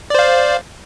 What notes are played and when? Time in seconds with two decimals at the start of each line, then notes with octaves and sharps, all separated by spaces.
0.10 D5
0.15 C5
0.19 F5